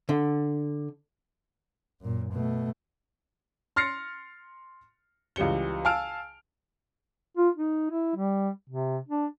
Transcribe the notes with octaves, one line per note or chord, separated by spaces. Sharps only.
D3
F#2 A#2
B2 A3
C6 F6 A6 A#6 C7 C#7
C#2 E3 G3 C#7 G7
F5 G#5 A5 E6 F6 D7
F4
D#4
E4
G3
C3
D4